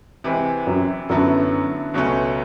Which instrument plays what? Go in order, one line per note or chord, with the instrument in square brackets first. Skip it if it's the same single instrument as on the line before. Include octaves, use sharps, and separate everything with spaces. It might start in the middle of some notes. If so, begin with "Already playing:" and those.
[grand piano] C3 E3 G#3
[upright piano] F#2
[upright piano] F#2 [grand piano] D3 F#3 B3 E4 A4
[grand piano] C#2 B2 F#3 A3 C#4